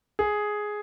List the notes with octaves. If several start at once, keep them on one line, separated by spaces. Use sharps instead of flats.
G#4